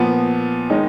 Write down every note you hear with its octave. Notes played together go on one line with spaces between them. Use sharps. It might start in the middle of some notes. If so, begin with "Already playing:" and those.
Already playing: A#2 F3 B3
D#3 G#3 D#4